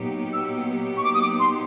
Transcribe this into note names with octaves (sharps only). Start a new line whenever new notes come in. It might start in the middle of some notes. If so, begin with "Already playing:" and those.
Already playing: A#2 F#3 B3 D#4 G4
E6
C#6
D6
D#6
D6
C6